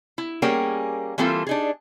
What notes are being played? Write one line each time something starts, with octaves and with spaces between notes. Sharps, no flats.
E4
G3 A#3 C#4 G#4 A#4 G5
E3 G3 A#3 C4 F4 A4
D4 D#4 G#4